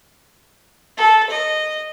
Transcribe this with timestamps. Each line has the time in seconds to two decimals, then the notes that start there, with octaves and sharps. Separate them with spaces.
0.97 A4
1.30 D#5